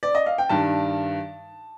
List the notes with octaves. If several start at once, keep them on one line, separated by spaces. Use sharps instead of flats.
D5
D#5
F5
G5
G2 D#3 A5